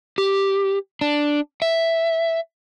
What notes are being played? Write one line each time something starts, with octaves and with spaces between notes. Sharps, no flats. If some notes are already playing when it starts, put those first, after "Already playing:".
G4
D4
E5